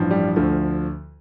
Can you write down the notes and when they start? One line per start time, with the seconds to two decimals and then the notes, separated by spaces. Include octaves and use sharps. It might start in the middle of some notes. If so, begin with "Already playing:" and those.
Already playing: A1 G2 F3
0.11 G3
0.36 D2 D3 F3 A3